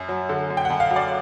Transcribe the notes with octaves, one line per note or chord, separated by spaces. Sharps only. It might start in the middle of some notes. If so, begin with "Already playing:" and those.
Already playing: F#2
F#3
D3
F#2
G5
F#5
F#2
F5
F#3
D5